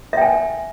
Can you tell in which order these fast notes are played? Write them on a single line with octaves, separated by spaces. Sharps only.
E5 G5 G#5